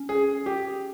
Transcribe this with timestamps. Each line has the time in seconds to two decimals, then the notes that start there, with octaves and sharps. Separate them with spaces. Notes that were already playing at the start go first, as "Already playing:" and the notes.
Already playing: C#4
0.09 G#4
0.46 G4